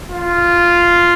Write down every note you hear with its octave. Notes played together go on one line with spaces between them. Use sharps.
F4